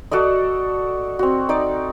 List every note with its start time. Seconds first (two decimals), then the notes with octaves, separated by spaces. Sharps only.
0.11 F#4 A4 D5 D#5
1.19 C4 F#4
1.49 D#4 D5